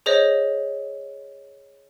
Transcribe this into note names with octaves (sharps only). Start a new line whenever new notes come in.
G#4 C5 C#5 D#5